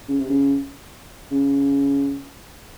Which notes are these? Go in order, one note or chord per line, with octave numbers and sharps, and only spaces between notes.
C#3
C3
C#3
C#3